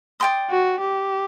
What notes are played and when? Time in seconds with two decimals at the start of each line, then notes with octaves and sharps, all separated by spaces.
0.20 D5 G5 C6 D#6
0.51 F#4
0.81 G4